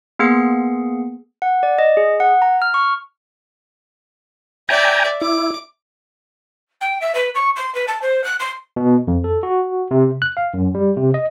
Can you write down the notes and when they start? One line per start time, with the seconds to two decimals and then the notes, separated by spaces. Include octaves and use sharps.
0.19 A#3 B3 G#4 C7 C#7
1.42 F#5
1.63 D5
1.79 D#5
1.97 G#4
2.20 F#5
2.42 A#5
2.62 F6
2.74 C#6
4.69 D5 E5 G5 G#5 A#5
5.21 E4 D6
6.80 G5
7.01 E5
7.14 B4
7.34 C#6
7.55 C6
7.74 B4
7.87 A5
8.01 C5
8.23 F#6
8.39 C6
8.76 B2
9.07 F2
9.24 A4
9.43 F#4
9.91 C3
10.22 F#6
10.37 F5
10.54 F#2
10.75 G3
10.97 C3
11.14 D#5